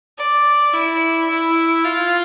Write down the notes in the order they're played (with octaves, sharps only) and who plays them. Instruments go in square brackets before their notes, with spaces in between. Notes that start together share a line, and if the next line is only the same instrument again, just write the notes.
[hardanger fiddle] D5
E4
E4
F4